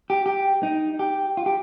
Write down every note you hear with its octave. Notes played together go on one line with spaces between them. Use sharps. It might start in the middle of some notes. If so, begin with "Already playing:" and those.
G4
G4
D#4
G4
F4
G4